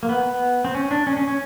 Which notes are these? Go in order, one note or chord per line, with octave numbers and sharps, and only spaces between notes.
A#3
B3
B3
C4
C#4
D4
C#4
C#4
C#4